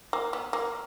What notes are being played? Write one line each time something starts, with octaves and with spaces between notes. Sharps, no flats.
A#3
B3
A#3